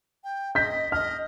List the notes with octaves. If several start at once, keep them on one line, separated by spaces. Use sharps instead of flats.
G5
D#5 G6 B6
D#5 F6